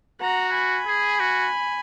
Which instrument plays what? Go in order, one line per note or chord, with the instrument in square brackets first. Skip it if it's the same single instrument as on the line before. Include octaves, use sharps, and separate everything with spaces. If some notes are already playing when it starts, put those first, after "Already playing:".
[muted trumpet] F#4 [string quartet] F#5 A#5
[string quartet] G#5 B5
[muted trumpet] G#4
F#4